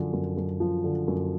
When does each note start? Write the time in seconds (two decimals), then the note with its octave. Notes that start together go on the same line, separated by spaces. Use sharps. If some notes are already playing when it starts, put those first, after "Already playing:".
Already playing: F#2 D3 F3
0.13 F#2
0.37 F#2
0.60 F3
0.84 D3
1.08 F#2